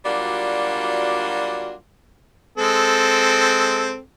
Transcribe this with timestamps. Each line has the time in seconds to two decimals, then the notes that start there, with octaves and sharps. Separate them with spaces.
0.05 F#3 G3 A#3 D4 F4 F#4
2.57 G#3 C4 A4